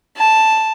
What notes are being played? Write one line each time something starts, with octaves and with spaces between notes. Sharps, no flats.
A5